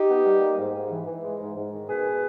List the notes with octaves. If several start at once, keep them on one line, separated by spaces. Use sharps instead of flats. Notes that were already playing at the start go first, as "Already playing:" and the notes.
Already playing: D#4 G4
B3
G3
A#3
G#2
G#2
E3
E3
G#3
G#2
G#2
D#3
B2 G#4 B4
B2